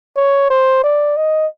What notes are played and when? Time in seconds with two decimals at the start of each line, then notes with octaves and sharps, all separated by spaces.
0.16 C#5
0.50 C5
0.84 D5
1.17 D#5